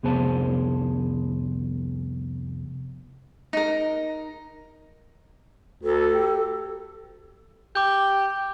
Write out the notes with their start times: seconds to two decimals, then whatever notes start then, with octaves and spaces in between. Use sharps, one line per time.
0.03 C2 F2 B3 G#4 C5 A5
3.53 D#4 A#4
5.84 D2 A4
6.14 G4
7.75 G4 D6 G6